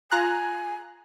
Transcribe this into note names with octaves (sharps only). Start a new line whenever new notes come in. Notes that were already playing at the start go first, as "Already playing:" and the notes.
F4 G#5 A#5 F#6